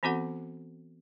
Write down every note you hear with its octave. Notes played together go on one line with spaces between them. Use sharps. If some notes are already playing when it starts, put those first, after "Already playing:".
E3 B3 C4 F#4 A4 F#5